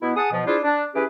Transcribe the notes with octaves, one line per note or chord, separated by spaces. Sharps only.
B2 B3 E4
G#4 F#5 A5 D#6
B2 F3
D4 E4 F4 G#4 C5
D4
E3 C#4 G4 G#4 B4